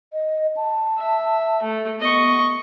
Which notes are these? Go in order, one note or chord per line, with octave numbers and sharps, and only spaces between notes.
D#5
A5
E5
A3
B3 D#5 C#6